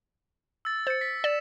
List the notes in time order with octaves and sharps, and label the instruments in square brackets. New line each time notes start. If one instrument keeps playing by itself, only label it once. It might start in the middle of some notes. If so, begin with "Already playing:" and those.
[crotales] E6 A6
[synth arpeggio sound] C5 [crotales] A6 C#7
[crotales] B6
[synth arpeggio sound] D5 [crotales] E7